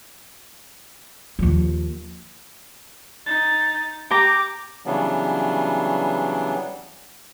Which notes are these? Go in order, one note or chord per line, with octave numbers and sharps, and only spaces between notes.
D#2 F3
D#4 A6
G4 A#5 D6
C#3 E3 F#3 G3 B3 D4